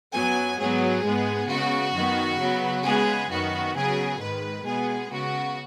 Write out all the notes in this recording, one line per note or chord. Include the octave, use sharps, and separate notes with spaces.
F#2 F#3 B3 G#5
G#2 F#3 B3 G#4
G#2 G#3 B3
C#3 B3 F#4
F#2 D#3 B3
C#3 F#3 B3
C#3 G#3 B3 G#4
F#2 D#3 B3 F#4
C#3 F#3 B3 G#4
G#2 D#3 G#3 B4
B2 G#3 B3 G#4
C#3 B3 F#4